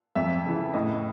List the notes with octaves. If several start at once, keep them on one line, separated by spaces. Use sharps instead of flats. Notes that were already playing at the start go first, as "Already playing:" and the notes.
F2 E5
C#3 E3
A2 D#5